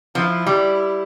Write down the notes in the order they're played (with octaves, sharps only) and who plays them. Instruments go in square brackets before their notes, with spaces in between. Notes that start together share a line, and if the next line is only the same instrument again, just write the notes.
[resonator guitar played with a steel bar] F3 [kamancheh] E4
[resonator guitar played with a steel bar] G3